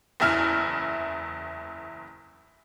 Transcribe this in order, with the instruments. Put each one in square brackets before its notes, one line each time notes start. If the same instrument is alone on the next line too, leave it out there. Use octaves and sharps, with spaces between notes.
[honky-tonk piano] F#1 E2 E4 F6